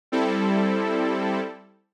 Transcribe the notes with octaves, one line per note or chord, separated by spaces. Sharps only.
G3 C4 E4 A4